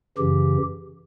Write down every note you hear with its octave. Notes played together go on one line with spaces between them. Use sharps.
F#2 C#3 E3 G4